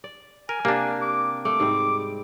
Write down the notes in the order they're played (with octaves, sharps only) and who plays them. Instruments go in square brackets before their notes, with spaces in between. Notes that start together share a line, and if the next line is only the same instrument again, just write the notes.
[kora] D5
[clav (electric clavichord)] A#4 [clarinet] G#5
[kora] C3 [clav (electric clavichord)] A#3 D4
[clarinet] D6
[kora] A3 [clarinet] D6
[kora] G#2 G3 C4